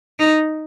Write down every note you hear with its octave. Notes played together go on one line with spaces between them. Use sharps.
D#4